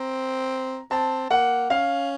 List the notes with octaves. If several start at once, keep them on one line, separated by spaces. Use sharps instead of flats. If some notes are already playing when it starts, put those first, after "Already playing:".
Already playing: C4 A#5
C4 A5
A#3 F#5
C#4 F5